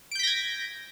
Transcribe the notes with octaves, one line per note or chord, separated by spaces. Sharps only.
G6 G#6 A#6 B6 D7